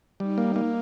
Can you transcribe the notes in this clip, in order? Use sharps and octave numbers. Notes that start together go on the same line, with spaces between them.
G3 D#4
A#3
A#3